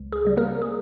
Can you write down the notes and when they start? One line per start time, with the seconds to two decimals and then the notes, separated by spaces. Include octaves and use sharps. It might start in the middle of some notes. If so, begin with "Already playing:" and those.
Already playing: C#2
0.12 G#4
0.25 C#3 G3
0.37 A#3 A#4
0.62 G#4